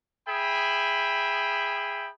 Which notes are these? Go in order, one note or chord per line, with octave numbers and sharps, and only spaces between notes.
G#4 E5 G5 B5